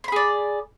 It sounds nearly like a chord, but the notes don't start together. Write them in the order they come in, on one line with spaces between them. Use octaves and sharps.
C6 B5 G#4 D5